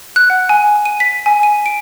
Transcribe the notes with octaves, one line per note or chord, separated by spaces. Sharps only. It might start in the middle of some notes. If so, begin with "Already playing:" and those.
F#6
F#5
G#5
D#7
B6
G#5
D#7
D7